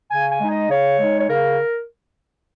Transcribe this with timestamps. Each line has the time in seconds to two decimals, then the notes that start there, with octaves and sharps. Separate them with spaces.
0.11 C#3 G#5
0.30 G#5
0.40 G#3 D#4
0.50 D#5
0.69 C#3 C#5
0.99 G#3 D#4
1.21 C#5
1.29 C#3 A#4